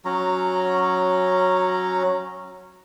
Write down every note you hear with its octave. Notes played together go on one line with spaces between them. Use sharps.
F#3 C#4 A#5